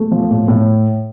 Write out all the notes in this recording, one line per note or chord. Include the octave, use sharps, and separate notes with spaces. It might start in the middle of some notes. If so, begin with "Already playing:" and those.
Already playing: A3
F3
A2
A2